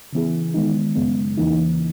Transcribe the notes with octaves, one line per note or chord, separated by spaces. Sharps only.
C#3 E3 B3 E4 G#4
D#3 G#3 B3 D#4
F#2 C#3 G#3 B3
E2 C#3 E3 A#3 D#4